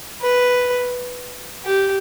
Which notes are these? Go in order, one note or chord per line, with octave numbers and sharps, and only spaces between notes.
B4
G4